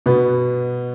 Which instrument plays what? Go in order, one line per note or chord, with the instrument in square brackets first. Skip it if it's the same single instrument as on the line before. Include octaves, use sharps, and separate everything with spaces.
[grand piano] B2 B3